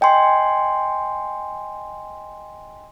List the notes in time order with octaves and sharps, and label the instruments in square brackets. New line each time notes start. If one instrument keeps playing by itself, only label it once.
[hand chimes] D#5 G5 G#5 C6